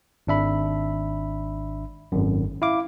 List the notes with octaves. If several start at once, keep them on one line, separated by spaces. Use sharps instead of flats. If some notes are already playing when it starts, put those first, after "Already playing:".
G#1 D4 E5 B5
G#1 F#2
E4 F5 D6